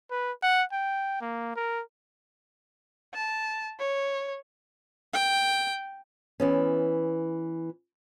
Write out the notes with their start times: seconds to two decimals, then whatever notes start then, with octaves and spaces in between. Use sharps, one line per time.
0.11 B4
0.43 F#5
0.72 G5
1.21 A#3
1.56 A#4
3.14 A5
3.79 C#5
5.13 G5
6.40 E3 B3 C#4